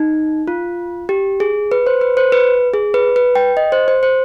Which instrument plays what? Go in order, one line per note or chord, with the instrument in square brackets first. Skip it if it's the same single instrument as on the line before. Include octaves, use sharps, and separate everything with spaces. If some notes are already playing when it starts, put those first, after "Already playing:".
Already playing: [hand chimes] D#4
F4
G4
G#4
B4
C5
B4
C5
B4
G#4
B4
B4
G5
D#5
C5
C5
C5